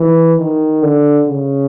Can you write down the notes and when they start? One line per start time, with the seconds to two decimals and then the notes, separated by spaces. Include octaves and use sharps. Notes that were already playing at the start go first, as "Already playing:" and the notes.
Already playing: E3
0.39 D#3
0.82 D3
1.28 C#3